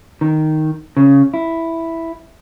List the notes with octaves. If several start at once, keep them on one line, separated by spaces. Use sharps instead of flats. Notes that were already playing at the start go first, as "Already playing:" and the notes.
D#3
C#3
E4